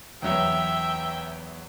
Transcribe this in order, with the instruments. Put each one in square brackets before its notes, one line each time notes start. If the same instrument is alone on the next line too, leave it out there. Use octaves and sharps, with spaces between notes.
[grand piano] E2 F#3 B3 [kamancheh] E5 G5